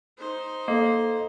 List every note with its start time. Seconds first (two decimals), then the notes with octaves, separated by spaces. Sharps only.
0.18 D#4 C5
0.68 A#3 A4 D#5